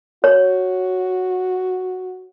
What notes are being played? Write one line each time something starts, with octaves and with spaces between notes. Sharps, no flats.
F#4 C#5